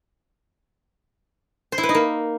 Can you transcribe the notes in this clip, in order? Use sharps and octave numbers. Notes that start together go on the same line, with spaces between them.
C5
E4
B4
D#4
A#3